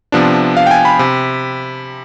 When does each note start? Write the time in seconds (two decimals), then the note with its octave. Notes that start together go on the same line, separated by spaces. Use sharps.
0.12 C3 F3 B3 D4
0.57 F5
0.67 G5
0.71 G#5
0.85 B5
0.99 C3